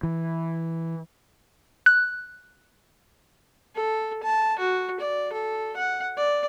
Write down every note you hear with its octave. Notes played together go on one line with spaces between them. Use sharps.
E3
F#6
A4
A5
F#4
D5
A4
F#5
D5